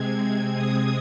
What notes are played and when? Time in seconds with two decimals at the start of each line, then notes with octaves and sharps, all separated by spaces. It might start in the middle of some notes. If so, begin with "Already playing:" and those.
Already playing: C3 G#3 C4 G#6
0.54 D#6